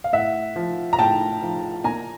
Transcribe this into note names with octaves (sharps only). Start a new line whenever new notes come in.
F5
A2 E5 F#5
F3
A#5
A2 G5 A5
F3
A#2 G#5 A#5